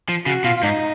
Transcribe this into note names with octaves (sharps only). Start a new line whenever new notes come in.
F3
C#3 F#4
B2 F4
F4
G#2 D#4